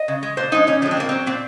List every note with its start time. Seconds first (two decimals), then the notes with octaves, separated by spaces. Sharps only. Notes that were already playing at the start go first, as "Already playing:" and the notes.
Already playing: D#5
0.08 C#3
0.23 G#3
0.37 A#2 C5
0.52 F3 G#3 D#4
0.67 A#2 C#4
0.82 F3 G#3 C#4
0.91 C4
0.97 A#2 A#3
1.09 F#3 C4
1.27 A#2 C4